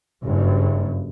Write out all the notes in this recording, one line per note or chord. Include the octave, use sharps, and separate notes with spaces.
F#1 G2